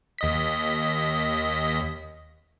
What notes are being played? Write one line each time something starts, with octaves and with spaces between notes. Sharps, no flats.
D#2 D#5 B6